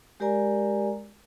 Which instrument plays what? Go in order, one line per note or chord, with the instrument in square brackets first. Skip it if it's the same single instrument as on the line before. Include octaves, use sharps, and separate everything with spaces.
[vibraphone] G#3 G4 A#4 D5 G#5 A#5